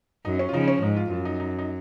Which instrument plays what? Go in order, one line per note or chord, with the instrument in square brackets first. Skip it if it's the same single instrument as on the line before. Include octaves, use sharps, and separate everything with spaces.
[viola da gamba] F#2 [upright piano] D#4
[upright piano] C#4
F4
[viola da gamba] C#3 F3 [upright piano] D#4
[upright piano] C#4
[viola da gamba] G#2 [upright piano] D#4
[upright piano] F4
[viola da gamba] F#2 [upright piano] F4
[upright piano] D#4
D#4
D#4